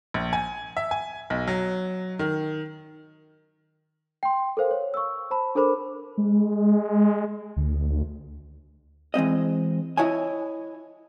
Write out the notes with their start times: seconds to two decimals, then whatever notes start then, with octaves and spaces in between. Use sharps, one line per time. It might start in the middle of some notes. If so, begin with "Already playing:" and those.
0.14 A#1
0.33 G#5
0.77 E5
0.91 G#5
1.30 B1
1.47 F#3
2.19 D#3
4.23 G5 C6
4.57 A4 A#4 C5 F5
4.71 C#5
4.94 C#6 E6
5.31 C5 A5 B5
5.55 D4 A4 A#4 C5 B5 D6
6.18 G#3
7.57 D2
9.14 E3 G#3 C4 D#5
9.97 E4 C#5 D#5 G#5